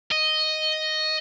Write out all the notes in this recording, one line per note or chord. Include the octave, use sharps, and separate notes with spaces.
D#5